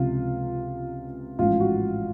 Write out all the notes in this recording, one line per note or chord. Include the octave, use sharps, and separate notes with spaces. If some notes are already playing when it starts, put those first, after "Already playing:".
Already playing: C#2 C3 F3 F4
A1 G#2 F3 F4
F#4